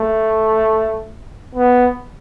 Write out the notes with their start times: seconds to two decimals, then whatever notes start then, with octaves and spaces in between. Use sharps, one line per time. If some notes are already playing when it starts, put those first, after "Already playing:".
Already playing: A3
1.55 B3